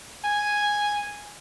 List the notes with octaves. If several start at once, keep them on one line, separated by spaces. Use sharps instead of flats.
G#5